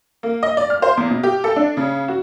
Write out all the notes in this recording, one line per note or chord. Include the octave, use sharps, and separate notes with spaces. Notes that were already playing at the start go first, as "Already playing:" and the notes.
A#3
D#5
D5
F6
C5
E2
B2
G4
A4
D4
C#3
F#4